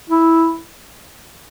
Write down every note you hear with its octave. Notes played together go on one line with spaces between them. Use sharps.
E4